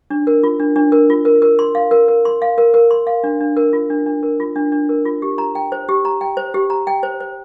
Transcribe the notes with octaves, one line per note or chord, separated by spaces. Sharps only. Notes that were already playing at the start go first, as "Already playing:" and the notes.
D4
A#4
F4
D4
D4
A#4
F4
A#4
A#4
C6
F5
A#4
A#4
C6
F5
A#4
A#4
C6
F5
D4
D4
A#4
F4
D4
D4
A#4
F4
D4
D4
A#4
F4
G4
A#5
G5
C5
G4
A#5
G5
C5
G4
A#5
G5
C5
C5